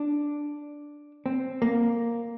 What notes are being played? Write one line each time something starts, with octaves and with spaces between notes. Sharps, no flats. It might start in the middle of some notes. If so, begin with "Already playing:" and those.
Already playing: D4
C4
A#3